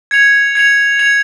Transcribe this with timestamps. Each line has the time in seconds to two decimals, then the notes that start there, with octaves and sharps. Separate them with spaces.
0.11 G#6 C#7 F7
0.55 G#6 C#7 F7
0.99 G#6 C#7 F7